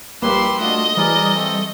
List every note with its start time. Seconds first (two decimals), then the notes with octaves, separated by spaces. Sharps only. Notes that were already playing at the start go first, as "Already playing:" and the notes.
0.22 A#1 G3 A#3 E4 G4 B4 C6
0.61 A3 D4 F4 F#4 D#5
0.97 E3 G3 G#4 A#4 D5
1.35 A3 C4 A4